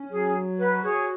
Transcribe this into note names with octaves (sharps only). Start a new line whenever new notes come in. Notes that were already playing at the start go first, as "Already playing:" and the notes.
Already playing: C#4
F#3 G#4
F#4 B4
G#4 C#5